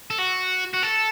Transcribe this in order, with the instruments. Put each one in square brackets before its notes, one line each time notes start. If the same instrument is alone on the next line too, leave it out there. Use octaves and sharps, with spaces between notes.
[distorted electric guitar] A4
F#4
F#4
A4